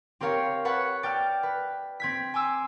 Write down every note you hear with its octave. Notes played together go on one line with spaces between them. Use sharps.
C4 G4 A#4 C#5 F5
B4 C#5 F#5 A5
D5 G5 A5 F6
B4
C4 G#6 B6
G#5 C6 D6 E6